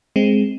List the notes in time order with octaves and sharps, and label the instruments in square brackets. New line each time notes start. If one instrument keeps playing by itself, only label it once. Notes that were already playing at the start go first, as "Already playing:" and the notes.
[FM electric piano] G#3 C4